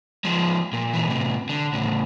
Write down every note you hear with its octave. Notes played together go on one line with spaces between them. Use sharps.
F3 G#3
A#2
A#2 E3
A2 C3
D3
A2 C#3